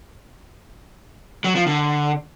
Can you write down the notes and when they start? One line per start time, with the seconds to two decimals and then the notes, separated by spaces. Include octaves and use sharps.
1.44 F#3
1.56 F3
1.67 D3